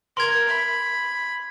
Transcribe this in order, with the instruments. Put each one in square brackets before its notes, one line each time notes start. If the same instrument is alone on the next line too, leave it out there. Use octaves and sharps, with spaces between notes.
[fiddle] A#4 [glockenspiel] C6 G#6
[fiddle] B5